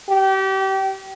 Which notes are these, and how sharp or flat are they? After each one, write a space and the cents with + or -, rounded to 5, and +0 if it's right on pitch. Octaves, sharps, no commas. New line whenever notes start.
G4 -30